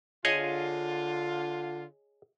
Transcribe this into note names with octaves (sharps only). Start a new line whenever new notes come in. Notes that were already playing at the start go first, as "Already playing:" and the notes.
D3 F4 G#4 C#5 D#5